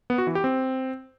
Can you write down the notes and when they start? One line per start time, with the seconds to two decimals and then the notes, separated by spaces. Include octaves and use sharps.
0.10 B3
0.18 F#4
0.27 E3
0.35 G4
0.44 C4